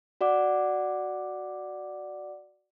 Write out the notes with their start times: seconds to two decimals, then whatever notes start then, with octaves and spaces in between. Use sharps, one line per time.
0.21 F#4 D5 F#5 D6